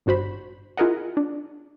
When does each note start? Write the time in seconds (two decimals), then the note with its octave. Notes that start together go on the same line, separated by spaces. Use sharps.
0.06 G#1 G2 F#4 C5 B5
0.77 E4 F4 G#4 A#4 D#5 F#5
1.17 D4